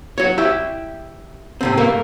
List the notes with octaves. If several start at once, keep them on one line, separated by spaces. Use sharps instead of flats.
F#4 C#5
E4 G4 E5
A2 C3 C4
G2 A3 A#3 A#4